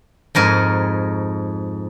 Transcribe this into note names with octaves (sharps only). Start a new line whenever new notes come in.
F2 G#2 A#4 G#5